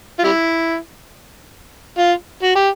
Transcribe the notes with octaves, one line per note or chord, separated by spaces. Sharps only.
F4
G3 E4
F4
F#4
G4